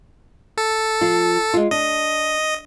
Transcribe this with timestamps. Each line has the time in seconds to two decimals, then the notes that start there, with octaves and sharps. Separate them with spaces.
0.58 A4
1.01 F3 F4
1.54 G#3 F4
1.71 D4 D#5